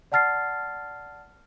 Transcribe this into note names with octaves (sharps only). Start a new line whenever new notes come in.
D5 F#5 A5 F6 A6 C7